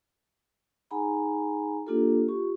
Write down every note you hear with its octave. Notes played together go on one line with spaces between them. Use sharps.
D#4 G#4 F#5 G#5 A#5 B5
A#3 D4 F4 G4 A4
F4 G4 C#6